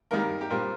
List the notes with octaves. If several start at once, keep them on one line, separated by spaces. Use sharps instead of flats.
D#2 D#3 G3 A#4
G4
A#2 G3 C4 A#4